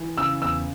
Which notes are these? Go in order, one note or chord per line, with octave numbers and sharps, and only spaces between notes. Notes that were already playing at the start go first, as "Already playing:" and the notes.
Already playing: E3
C#3 E6
E2 E6